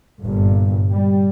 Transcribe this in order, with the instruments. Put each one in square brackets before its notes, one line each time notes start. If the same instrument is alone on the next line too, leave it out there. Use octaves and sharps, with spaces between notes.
[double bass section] G1 G2 A#2
G3